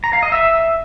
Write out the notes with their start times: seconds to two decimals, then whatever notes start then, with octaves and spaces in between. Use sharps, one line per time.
0.04 A#5
0.13 F5
0.23 D#5
0.32 E5